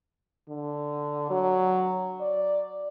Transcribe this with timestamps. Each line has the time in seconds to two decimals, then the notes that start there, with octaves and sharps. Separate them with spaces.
0.49 D3
1.30 F#3
2.21 D5